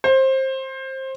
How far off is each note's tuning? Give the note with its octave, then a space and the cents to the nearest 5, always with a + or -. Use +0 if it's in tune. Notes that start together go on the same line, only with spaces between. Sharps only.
C5 +20